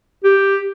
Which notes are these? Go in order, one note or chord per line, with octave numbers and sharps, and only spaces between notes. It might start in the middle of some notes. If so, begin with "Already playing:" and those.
G4